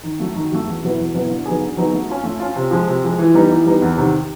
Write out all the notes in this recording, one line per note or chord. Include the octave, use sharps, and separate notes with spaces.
D#3
F#3 A3
D#3
F#3 A3
E2
B2 F#3 B3 E4
E2
B2 F#3 B3 E4
D3
F#3 B3 D#4 G#4
D3
F#3 B3 D#4 G#4
A3
C#4 F4
A3
C#4 F4
C3
F3 G#3
C3
F3 G#3
E3
G3 B3 D#4
E3
G3 B3 D#4
E2
C3 D#3